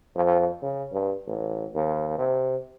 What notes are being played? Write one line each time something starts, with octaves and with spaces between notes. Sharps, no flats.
F2
C#3
G2
A1
D#2
C3